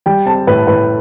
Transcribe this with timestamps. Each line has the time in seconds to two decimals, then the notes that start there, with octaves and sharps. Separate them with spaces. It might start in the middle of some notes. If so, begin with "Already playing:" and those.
0.06 G3 G5
0.26 C4 A5
0.47 A2 B4
0.67 A2 B4